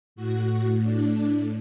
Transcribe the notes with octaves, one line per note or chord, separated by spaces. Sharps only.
A2 F#4
D4